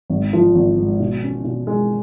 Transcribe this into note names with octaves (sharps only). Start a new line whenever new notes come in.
G#1
F3
G#1
G#2
B2
C#4
B2
G#3